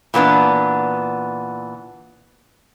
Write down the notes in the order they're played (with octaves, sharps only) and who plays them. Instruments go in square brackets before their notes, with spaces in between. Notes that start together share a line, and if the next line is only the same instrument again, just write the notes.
[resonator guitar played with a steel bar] A#2 E3 B3 D4